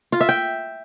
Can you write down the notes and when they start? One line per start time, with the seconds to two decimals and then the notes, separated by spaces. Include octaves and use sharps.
0.12 F4
0.21 E5
0.29 G5